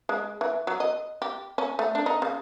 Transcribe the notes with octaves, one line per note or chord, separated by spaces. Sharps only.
G#3
E3
F#3
D#5
G4
C#4
A3
D4
D#4
C#3